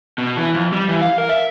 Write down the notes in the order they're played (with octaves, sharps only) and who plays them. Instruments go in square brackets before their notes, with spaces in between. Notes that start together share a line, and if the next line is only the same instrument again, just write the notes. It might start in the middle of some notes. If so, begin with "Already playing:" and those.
[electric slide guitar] B2
E3
F2
G3
E3
F5
A#4
E5